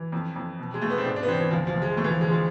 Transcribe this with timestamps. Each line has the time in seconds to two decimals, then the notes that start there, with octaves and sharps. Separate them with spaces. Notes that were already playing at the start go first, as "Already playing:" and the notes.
Already playing: E3
0.12 F2
0.36 F2
0.59 B2
0.74 G#3
0.82 B2 A3
0.90 B3
0.98 C4
1.05 G#2 D4
1.16 D4
1.23 B3
1.27 E3 C4
1.40 E3
1.51 D2 F3
1.67 F3
1.74 D2
1.82 G#3
1.97 F2 A3
2.04 E3
2.09 F3
2.21 D3 G#3
2.32 F3